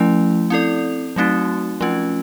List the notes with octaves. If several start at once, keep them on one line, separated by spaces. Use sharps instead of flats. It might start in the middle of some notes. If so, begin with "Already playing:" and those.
Already playing: F3 A3 C#4 E4
C4 E4 A4 D5
F#3 A3 C4 D#4 F#4
F3 A3 C#4 F4